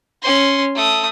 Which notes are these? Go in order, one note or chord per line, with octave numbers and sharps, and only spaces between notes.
C#4 C6
A3 D#6